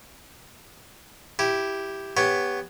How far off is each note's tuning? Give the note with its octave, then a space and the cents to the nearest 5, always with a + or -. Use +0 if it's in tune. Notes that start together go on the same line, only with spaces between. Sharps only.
E4 +0 G4 +0
B3 +0 G4 +20 C#5 +5